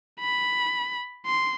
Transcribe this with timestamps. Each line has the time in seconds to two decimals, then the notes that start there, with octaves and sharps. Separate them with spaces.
0.20 B5
1.26 C6